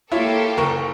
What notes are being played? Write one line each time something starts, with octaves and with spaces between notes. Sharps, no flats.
A#3 E4 F4 G4 A4 C#5
F#1 A#4 C#6